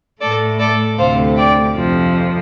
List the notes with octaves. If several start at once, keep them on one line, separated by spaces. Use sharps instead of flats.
A2 A3 A4 D5
A4 D5
D2 C3 A3 C5 F5
D5 G5
F2 C3 F3